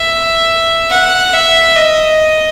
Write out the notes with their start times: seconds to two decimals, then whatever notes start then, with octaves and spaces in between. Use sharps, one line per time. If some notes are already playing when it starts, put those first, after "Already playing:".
Already playing: E5
0.90 F#5
1.33 E5
1.76 D#5